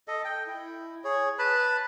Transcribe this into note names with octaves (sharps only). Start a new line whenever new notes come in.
A4 D#5
G5
E4
G#4 C#5
B4 A5 B5